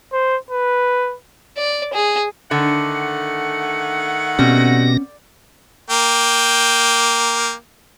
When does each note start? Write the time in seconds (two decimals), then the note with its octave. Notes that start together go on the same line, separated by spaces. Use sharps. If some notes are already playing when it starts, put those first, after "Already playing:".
0.12 C5
0.51 B4
1.57 D5
1.93 G#4
2.51 D3 D#3 A3 F#5
4.39 B2 G3 C4 C#4 A#6
5.90 A#3 G5